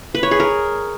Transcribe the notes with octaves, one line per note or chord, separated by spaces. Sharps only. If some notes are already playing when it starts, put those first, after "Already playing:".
B4
C#5
G#4
A#4